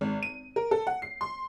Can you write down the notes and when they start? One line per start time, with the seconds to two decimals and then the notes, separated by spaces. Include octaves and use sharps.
0.01 G#1
0.23 D#7
0.56 A#4
0.71 A4
0.87 F#5
1.02 C7
1.21 C6